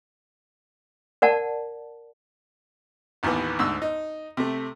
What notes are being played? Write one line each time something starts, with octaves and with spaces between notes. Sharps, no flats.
A#4 D5 F#5 A5
A1 D#2 E3 B3
D2 G#2 E6
D#4
C3 A3